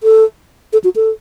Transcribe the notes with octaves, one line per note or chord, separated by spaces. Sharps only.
A4
A4
F#4
A4